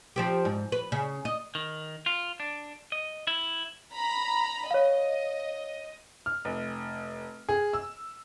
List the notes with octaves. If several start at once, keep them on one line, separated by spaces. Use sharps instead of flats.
F3 C4 G4
G#2
B4
C#3
D#5
D#3
F4
D4
D#5
E4
A#5 B5
C#5 D#5 F5
F6
F1
G#4
E6